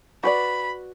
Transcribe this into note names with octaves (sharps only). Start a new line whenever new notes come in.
F#4 B4 D5 B5